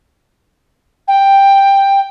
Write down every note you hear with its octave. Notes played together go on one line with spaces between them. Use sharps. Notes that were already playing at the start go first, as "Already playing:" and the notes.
G5